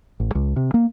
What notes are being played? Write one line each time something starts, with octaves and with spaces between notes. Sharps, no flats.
A1
C#2
C3
A#3